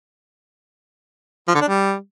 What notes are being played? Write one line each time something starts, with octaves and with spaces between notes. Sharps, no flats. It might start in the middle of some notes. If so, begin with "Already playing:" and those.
F3
D3
D4
G3